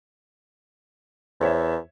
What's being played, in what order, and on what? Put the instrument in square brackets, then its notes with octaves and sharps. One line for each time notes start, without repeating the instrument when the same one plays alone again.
[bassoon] E2 [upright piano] C5 C#5 E5